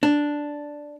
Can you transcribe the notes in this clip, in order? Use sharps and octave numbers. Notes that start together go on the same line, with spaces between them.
D4